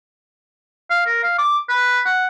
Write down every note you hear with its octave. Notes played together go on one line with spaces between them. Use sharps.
F5
A#4
F5
D6
B4
F#5